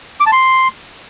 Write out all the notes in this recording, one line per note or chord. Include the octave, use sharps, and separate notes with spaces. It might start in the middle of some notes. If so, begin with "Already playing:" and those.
D6
A5
C6